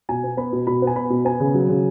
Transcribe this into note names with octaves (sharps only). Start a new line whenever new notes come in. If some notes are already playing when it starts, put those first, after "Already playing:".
B2 G#5
B3
B3 B5
B2
B2 B5
B3
G#5
B3 B5
B2
B3 G#5
C#3
F#3
C#3